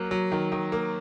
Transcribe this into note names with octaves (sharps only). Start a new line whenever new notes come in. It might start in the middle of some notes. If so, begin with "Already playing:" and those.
Already playing: F#3 A#3
F#3
D#3
D#3
A#3